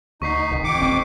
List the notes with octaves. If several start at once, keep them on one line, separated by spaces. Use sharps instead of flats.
D2 D#4 C#6 B6 C7
D1 C2
F2 D#3 D6 C#7
E1 A1 C4